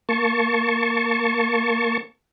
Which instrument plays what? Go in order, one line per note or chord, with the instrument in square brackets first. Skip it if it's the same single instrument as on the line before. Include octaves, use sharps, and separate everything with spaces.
[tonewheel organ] A#3 A5 C#6